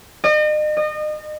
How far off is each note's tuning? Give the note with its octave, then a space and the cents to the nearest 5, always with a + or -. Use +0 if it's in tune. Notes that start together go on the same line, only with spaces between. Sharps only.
D#5 -40
D#5 -30